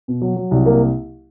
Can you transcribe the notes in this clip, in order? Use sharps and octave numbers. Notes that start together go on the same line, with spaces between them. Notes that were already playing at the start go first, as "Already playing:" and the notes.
B2
F#3
F#3
C2
A#3